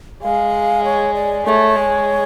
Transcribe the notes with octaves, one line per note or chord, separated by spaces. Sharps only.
G#3 F5
C#5
D5
A3 C#5 D5
G#3